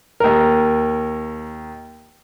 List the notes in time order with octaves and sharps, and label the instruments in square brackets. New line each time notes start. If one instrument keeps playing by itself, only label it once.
[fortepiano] D#2 A#4